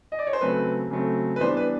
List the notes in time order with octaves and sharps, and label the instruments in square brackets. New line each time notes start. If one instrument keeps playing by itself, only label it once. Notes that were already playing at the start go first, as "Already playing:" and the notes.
[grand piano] D#5
D5
C#5
C5
C#3 F#3 A3 C4 B4
C#3 F#3 A3 C4
B4
E3 G3 B3 D4 C5
B4